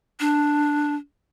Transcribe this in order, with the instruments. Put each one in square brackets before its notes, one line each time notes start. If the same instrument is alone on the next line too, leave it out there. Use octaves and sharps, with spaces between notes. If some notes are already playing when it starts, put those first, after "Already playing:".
[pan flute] D4